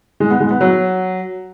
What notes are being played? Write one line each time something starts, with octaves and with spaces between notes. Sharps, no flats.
G#3
B3
G#3
B3
F#3